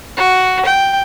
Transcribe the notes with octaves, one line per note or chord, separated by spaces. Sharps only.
F#4
G5